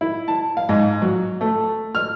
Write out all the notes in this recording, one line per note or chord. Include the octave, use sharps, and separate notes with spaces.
E4
A5
F5
G#2
F#3
A3
F6